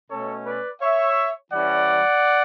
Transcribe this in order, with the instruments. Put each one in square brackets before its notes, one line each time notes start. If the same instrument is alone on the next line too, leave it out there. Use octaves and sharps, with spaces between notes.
[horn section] B2 A3 C#4 A4 C#5
B4 D5
C#5 E5
E3 G3 C#4 D5 F#5